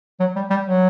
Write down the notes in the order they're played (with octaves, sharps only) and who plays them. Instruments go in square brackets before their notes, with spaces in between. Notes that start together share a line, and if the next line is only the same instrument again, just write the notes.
[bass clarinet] F#3
G3
G3
F#3